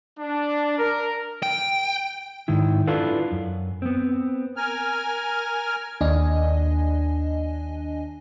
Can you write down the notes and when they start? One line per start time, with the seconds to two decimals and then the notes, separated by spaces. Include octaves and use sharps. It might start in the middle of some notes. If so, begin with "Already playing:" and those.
0.19 D4
0.79 A#4
1.43 G5
2.48 G#2 D#3 E4
2.87 D4 E4 F4 A4 B4
3.32 F#2
3.82 B3 C4
4.57 A#4 G#5 F6
6.01 D#2 D4 D#5 G#5